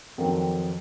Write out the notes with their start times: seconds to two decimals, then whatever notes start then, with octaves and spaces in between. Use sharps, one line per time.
0.18 F2 D#3 F#3 C4